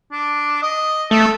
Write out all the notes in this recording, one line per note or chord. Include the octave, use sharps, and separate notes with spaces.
D4
D#5
A3 A4